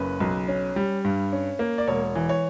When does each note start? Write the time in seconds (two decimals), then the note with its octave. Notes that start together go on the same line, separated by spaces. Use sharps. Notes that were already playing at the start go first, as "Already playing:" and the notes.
Already playing: F#1 C#3 B4
0.20 B1
0.48 C#4
0.76 G3
1.04 G2
1.32 C#4
1.59 A#3
1.78 D5
1.88 E1 C#5
2.15 E3
2.29 C#5